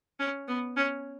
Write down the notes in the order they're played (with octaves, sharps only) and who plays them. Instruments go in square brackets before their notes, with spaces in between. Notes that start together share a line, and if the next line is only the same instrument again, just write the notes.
[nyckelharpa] C#4
B3
C#4